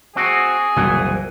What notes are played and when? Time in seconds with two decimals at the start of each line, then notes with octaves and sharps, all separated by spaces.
0.16 C4 F#4 G#4
0.76 F#1 C2 A#2 E3